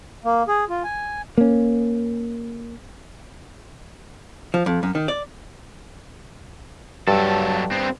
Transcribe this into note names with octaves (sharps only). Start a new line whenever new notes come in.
A#3
G#4
F4
G#5
A#3 C#4
F3
F2
F#2
D#3
D5
G2 F#3 A4
B3 C4